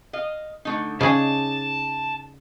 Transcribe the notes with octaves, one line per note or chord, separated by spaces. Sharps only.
D#5 F5
D3 A3 D#4
C#3 D#4 G#4 D5 D#5 A5